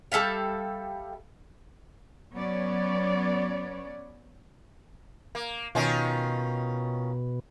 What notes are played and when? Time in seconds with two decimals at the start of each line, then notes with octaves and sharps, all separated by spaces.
0.12 G3 A4 E5 F5
2.34 F#3 B3 C#4 C#5 D5
5.35 A#3
5.75 B2 D#3 C#4 F4